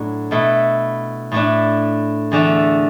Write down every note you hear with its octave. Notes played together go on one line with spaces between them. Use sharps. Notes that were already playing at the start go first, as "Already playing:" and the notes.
Already playing: A2 F#3 D4
B2 A3 E4
A2 A3 D4
E2 D3 A3